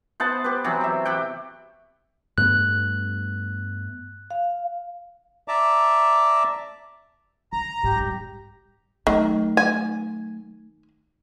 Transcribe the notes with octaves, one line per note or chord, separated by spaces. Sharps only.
B3 C5 F#5 A5
G4 B4
C3 E3 F#3
G4 E5
G4 F#5 G5
G2 A3 B3 F#6
F5
D5 E5 A5 A#5 D6
C2 A#5
C#2 G#2 G4
G#1 G3
D#3 F#3 A3
G#5